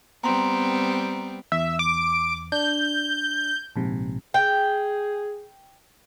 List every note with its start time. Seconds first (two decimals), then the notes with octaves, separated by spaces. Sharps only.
0.24 G3 B3 C4 A#5 C6
1.52 E2 E5
1.79 D6
2.52 D4 G6
3.76 A#1 G#2 C3
4.34 G#4 G5